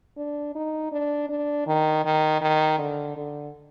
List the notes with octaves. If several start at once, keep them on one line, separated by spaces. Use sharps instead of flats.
D4
D#4
D4
D4
D#3
D#3
D#3
D3
D3